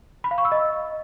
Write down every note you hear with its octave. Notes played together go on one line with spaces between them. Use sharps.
B5
F5
C#6
E6
D#5